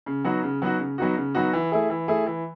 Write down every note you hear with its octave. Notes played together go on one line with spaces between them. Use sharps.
C#3
F#3 B3 D#4 F#4
C#3
F#3 B3 D#4 F#4
C#3
F#3 B3 D#4 F#4
C#3
F#3 B3 D#4 F#4
E3
A3 E4 G#4
E3
A3 E4 G#4
E3